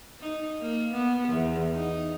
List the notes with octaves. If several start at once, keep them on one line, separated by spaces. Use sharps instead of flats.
D#4
A#3
B3
E2
D#4